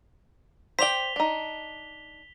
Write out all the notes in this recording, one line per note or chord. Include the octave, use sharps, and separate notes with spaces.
C5 D5 G5 B6 F7 G7
D4 D#4